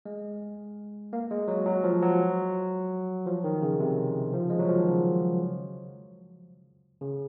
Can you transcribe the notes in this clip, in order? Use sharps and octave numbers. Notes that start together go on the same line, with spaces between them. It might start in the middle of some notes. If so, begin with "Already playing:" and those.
G#3
A#3
G#3
F#3
F#3
F3
F#3
F3
D#3
C#3
C3
F3
G#3
F#3
F3
D#3
C#3
C#3